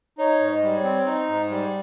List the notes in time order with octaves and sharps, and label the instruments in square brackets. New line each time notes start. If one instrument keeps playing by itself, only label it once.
[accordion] D#4 [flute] C#5
[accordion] G#2
[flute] D#5
[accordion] G3
[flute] C#5
[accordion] C4
D#4
G#2
G3